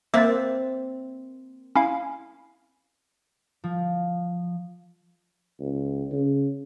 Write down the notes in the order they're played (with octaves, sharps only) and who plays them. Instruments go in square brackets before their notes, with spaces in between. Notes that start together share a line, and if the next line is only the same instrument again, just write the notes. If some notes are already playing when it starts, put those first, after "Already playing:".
[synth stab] A#3 [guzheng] C4 [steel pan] E5 [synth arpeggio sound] D6 F#6 A6
[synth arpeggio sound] C#4 E4 F5
[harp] F3
[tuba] C#2
C#3